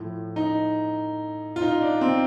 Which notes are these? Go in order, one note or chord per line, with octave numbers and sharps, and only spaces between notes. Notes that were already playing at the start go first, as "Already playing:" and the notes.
Already playing: A2 F3
D#4
F4
D#4
D4
C4